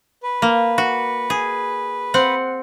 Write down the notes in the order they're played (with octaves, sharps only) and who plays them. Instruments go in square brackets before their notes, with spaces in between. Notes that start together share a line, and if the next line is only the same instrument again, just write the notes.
[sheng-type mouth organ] B4
[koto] A#3
F#4
G#4
C4 F#5